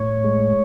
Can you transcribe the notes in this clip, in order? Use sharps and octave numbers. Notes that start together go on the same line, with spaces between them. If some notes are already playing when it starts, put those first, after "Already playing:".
Already playing: A2 C#5
G#3